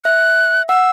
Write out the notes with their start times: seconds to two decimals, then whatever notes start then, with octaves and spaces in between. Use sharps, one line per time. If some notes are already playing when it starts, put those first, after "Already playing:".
0.05 E5 F#6
0.69 F#5 E6